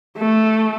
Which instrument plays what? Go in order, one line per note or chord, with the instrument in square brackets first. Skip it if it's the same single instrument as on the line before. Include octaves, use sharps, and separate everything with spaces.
[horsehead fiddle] A3